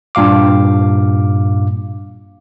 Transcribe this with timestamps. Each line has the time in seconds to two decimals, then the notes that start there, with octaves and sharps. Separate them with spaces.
0.15 G2 A#2 F5 D6